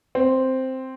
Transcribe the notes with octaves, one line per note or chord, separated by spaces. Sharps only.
C4